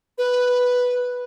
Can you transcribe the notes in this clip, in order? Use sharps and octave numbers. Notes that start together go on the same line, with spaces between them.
B4